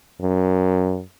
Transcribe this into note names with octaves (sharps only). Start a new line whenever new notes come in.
F#2